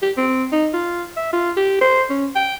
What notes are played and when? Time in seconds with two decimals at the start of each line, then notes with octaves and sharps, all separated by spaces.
0.02 G4
0.17 C4
0.52 D#4
0.74 F4
1.17 E5
1.33 F4
1.57 G4
1.81 C5
2.10 C#4
2.35 G5